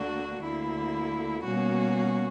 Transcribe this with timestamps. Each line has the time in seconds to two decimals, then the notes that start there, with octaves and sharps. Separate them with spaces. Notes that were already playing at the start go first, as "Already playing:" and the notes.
Already playing: D2 D3 A#3 D4 F#4
0.41 D2 D3 A#3 E4
1.44 B2 G3 A#3 C#4 F#4